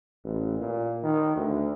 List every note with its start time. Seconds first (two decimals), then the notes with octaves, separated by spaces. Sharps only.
0.24 A1
0.60 A#2
1.03 D#3
1.36 D2